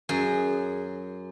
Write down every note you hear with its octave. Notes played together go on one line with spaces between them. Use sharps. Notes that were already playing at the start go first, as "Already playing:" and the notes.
F#2 G#4